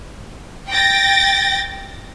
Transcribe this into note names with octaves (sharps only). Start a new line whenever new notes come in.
G5 A6 A#6